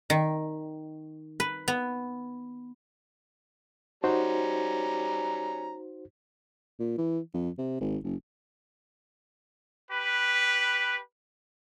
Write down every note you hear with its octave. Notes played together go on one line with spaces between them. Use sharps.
D#3
B4
B3
G3 C#4 D#4 F#4 C5 A#5
A#2
E3
F2
C3
G#1
F#1
G4 B4